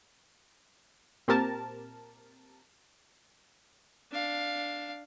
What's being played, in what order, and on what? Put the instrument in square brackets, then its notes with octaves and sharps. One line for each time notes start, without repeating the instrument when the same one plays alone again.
[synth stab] A#2 C4 G4 A#4 A5
[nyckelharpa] D4 F5